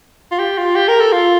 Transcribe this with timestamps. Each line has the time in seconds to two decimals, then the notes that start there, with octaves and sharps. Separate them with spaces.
0.32 F4
0.39 G4
0.58 F4
0.76 G4
0.88 A#4
1.00 A4
1.13 F4